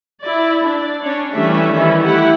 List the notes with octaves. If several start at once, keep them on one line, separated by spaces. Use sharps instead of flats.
E4 D5
D4 D5
C#4 D4 C#5
E3 G3 A3 C#4 D4 E5
D#3 E3 G3 C#4 E4
A3 E4 G4 F#5